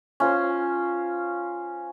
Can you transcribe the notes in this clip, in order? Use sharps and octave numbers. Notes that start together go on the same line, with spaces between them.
C#4 F4 C5